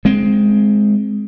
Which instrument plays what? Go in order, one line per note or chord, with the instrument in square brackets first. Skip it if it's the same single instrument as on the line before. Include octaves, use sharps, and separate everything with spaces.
[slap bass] G#3 C4